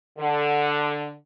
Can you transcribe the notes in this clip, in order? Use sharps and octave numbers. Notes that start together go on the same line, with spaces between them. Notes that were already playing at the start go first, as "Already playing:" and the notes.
D3